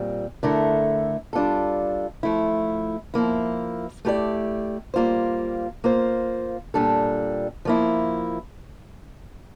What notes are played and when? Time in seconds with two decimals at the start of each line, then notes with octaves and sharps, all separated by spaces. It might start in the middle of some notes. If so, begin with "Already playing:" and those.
Already playing: A#2 G3 C4
0.43 D3 A3 E4 A#4
1.33 G3 D4 F4 A4
2.23 F3 A3 E4
3.14 F3 A#3 E4
4.05 A3 E4 G4 A#4 D5
4.94 G3 A#3 F4 C5
5.84 A#3 F4 C5
6.74 A#2 G3 D4 A4
7.65 F3 A#3 E4